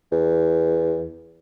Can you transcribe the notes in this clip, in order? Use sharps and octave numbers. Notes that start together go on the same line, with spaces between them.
E2